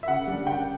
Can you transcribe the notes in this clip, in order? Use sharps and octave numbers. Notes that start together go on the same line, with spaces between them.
E5
C#3 F#5
G3 D4
C#3 G5